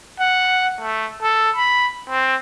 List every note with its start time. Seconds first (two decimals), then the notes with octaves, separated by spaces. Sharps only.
0.19 F#5
0.81 A3
1.22 A4
1.56 B5
2.09 C4